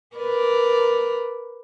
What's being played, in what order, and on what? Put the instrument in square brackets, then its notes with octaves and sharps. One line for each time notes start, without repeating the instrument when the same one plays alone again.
[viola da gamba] A#4 B4 D5